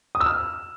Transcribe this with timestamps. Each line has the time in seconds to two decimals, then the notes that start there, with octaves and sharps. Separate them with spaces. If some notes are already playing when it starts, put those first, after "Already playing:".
0.15 D#6
0.21 E6
0.26 F6